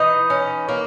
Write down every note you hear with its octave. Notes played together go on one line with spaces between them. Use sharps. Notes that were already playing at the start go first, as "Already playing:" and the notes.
Already playing: E3 D#4 D#5
C#4
A#3